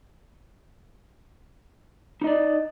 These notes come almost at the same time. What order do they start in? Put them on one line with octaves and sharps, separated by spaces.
D#4 D#5 D5